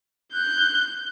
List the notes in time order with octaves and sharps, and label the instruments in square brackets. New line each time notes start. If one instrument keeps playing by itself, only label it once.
[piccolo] F#6 [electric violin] G6